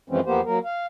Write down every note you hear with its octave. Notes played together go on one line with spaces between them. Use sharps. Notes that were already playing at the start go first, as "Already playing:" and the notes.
F#2 E3 F3 G#3 C4 C#4
E2 F3 A#3 B3 G4 C5
F#3 A#3 A#4
F5